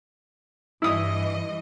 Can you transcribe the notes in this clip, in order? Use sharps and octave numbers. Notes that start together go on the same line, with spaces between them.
G2 E3 E4 D#5 D#6